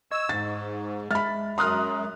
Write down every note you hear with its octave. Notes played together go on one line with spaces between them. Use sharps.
D#5 C#6 E6 G#6
G#2 A6
G#3 E5 B5 F6 A6
F#2 A#5 C6 D#6 F6 F#6